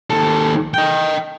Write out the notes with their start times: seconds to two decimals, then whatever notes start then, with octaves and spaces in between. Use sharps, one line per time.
0.10 D#2 A4
0.74 D#5 G5